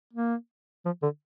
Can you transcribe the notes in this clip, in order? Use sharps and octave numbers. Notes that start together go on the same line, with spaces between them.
A#3
F3
D3